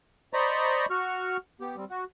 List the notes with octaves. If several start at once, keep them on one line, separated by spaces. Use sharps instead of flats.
C5 D5 D#5 A#5 B5 C#6
F#4 C#6 F6
B3 G4
G3 C4
F#4